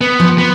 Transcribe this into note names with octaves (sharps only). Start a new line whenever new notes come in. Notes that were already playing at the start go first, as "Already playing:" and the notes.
B3
F3
B3